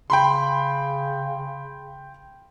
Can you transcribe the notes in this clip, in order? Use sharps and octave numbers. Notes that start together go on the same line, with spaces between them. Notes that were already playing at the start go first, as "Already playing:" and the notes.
C#3 G5 B5 C6